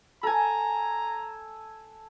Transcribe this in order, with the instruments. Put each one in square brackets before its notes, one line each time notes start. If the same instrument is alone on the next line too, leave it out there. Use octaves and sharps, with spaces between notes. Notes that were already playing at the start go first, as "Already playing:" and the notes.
[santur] A4 G#5 [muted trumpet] A#5